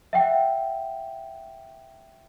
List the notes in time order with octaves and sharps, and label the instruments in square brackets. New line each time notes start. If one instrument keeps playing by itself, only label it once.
[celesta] E5 F#5 G5